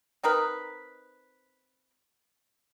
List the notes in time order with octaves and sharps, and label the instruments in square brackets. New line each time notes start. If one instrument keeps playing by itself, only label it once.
[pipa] C4 D#4 A#4 B4